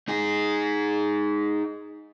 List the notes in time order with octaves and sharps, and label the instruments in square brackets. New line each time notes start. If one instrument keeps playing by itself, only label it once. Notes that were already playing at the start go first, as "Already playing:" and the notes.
[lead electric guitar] D#4 G#4